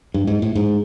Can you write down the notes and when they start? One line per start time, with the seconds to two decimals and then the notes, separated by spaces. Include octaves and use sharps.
0.14 G2
0.27 G#2
0.42 A2
0.55 G#2